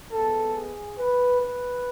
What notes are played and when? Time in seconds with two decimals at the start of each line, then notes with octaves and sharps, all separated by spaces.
0.12 B2 G#3 B3 A4
0.55 G#4
0.98 B4
1.41 B4